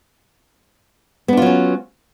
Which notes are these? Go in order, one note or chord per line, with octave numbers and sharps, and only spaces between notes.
F#3 B3 C#4 D4 F4